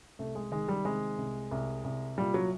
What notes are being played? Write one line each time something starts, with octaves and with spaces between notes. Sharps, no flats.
C2 A3
G#3
D#3 G#3
G3
C3 G#3
C2
C2
C2
A#2 G3
F#3